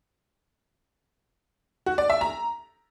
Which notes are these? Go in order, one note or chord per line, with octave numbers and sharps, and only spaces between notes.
F#4
D5
E5
A#5